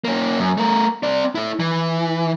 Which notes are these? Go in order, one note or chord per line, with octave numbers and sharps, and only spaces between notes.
A#3 C#4
F#2
A3 A#4
C4 D5
E4 A4
E3